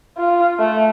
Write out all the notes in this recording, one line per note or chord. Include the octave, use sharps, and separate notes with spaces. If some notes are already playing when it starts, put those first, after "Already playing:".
F4
A3